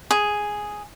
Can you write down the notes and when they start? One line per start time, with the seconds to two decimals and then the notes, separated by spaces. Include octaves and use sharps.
0.11 G#4